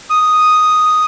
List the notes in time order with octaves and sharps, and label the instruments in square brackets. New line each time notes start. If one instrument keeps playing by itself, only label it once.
[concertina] D#6